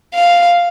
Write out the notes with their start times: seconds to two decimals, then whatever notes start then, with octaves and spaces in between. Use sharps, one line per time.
0.15 F5